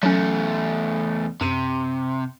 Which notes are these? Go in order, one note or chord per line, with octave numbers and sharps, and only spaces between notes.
E2 F#3 A3 C#4
F#2 C3 D#7